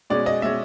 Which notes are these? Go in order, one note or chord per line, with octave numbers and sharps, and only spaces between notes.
B2 G#3 C#4 D5
D#5
B2 G#3 C#4 E5